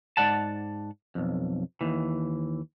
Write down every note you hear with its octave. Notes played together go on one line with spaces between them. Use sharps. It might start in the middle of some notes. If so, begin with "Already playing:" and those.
G#2 D5 F#5 A5
B1 F2
D#2 E3